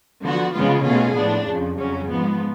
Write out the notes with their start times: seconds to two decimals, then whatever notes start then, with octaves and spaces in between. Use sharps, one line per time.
0.23 D3 F3 B3 F#4
0.54 C#3 F3 G#3 B3 F4
0.85 B2 A3 C#4 F4 G#4
1.15 A2 F3 B3 D4
1.46 F2 C#3 F3
1.77 F2 C#3 F#3 C#4
2.09 G#2 F3 B3